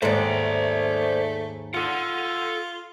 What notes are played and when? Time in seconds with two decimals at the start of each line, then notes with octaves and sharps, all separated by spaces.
0.02 D#2 G#2 A3 C5 D5
1.75 F4 A4 F#5